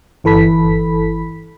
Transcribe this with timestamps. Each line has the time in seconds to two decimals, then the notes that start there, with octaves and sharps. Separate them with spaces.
0.24 G1 E3 A4 B5 B6